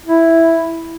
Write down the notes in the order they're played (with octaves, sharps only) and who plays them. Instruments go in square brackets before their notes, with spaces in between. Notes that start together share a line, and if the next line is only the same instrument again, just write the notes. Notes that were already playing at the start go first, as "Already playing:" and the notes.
[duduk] E4